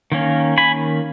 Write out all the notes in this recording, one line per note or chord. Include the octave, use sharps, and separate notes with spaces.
D#3 A#3 C#4
G#5 B5